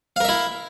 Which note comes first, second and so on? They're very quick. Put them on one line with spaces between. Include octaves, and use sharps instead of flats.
F5 A#4 E5 E4